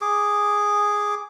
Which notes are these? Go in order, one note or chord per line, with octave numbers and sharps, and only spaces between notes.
G#4 D6